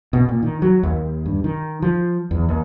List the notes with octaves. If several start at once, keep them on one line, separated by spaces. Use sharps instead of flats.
B2
A#2
D#3
F#3
D#2
G2
D#3
F3
E2
D#2